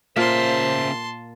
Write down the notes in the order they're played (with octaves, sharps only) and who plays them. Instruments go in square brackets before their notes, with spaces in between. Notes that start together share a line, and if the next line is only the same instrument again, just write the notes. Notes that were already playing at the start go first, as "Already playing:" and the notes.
[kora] A#2 A#3 [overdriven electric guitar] C#3 E5 [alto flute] C5 [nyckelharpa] A5 C6